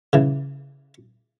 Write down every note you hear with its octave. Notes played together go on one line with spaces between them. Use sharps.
C#3 E3